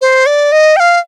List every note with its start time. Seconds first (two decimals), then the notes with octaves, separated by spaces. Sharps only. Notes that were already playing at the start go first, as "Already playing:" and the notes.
0.01 C5
0.26 D5
0.52 D#5
0.76 G5
0.80 F5